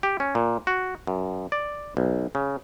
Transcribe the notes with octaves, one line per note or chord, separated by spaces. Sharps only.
G4
C#4
A#2
F#4
F#2
D5
B1
C#3